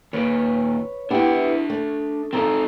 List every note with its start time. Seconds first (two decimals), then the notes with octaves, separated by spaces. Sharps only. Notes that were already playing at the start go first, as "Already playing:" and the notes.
0.13 D#2 A#2 B4 C#5
1.11 B3 D4 E4 G4 E5
1.70 A3
2.33 F3 C4 D#4 A4 A#5